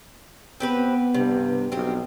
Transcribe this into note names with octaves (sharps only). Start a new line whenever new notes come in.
B3 C4 G4 B4
G2 C3
B1 C4 G4